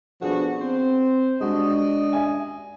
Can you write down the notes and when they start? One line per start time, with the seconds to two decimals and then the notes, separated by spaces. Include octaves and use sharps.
0.22 F3 B3 D4 F#4 G#4 A4
0.60 C4 C5
1.41 G#3 D4 F#4 G4 D#5
2.13 E5 G#5